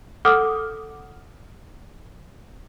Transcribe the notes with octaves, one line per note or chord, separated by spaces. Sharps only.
A4 F#5 D6 D#6 F6